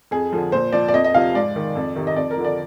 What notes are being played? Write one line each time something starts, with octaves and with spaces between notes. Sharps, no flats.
F2 G#4
D3 F3
A#2 C5
F3 D5
D5
F2 D#5
D#5
C3 F3 F5
G#2 D5
D#3
F2
C3 D#3
D#5
F2 D5
A#4
D3 F3
D5